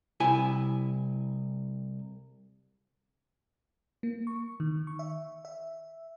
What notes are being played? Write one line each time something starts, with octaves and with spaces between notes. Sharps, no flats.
C2 E4 G#5
A#3
C#6
D#3
C#6
E5
E5